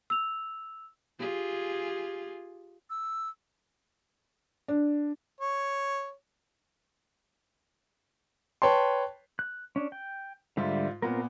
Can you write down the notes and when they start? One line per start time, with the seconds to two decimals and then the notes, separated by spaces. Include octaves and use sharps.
0.10 E6 F7
1.19 F4 G4 G#4
2.90 E6
4.68 D4
5.41 C#5
8.62 B4 C#5 G5 A5 C6
9.39 F#6
9.76 C#4 D4
9.92 G5
10.57 G#2 D3 G3 F4 E5
11.02 A#2 B3 C4 F4 A#4